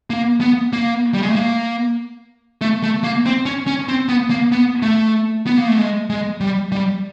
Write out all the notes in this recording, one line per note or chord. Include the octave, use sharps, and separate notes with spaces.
A#3
B3
A#3
G3
G#3
A3
A#3
A3
A3
A#3
C4
C#4
C#4
C4
B3
A#3
B3
A3
B3
A#3
A3
G#3
G#3
G3
G3